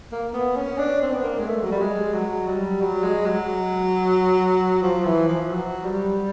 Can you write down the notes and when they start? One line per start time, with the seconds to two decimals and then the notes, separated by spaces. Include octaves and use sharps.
0.12 A#3
0.34 B3
0.57 C#4
0.78 D4
1.02 C4
1.13 B3
1.24 A#3
1.39 G#3
1.47 A3
1.63 F#3
1.71 G3
1.81 G#3
2.14 F#3
2.47 G3
2.81 F#3
3.03 G#3
3.26 F#3
4.82 F3
5.05 E3
5.28 F3
5.51 F#3
5.84 G3